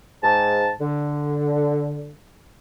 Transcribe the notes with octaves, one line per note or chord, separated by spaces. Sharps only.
G#2 A5
D3